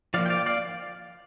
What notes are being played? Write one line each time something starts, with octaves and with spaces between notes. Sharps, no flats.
F3 A#3 D5 F5
G5
D5 F5
D5 F5